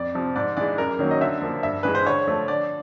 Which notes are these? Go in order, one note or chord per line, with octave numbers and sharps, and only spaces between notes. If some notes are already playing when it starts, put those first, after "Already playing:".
Already playing: F2 D5
C3 F3
G#2 D5
E3 G#3 D5
F#2 A#4
D#3 F#3 A#3 C#4
D#5
D3 E5
F3 A#3
G2 E5
E3 G#3 B4
C5
D3 C#5
F3 A3
D3 D5